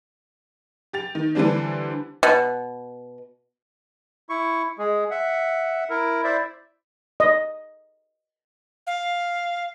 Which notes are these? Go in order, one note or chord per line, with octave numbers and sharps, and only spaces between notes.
G4 A6 F7
D#3
D3 E3 G3 C4 D4
B2
E4 C#6
G#3 G#4
E5 F#5
E4 A#4
E4 C5 D5 E5
D#5
F5